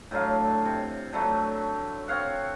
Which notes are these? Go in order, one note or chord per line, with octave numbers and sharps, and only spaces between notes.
A2 D3 F#3 F5
C3
D3 F#3 A3
C4 C#5 F5 F#5